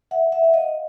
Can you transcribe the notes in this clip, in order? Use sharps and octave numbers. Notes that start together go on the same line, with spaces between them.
E5 F#5
E5 F#5
F#5
D#5 F5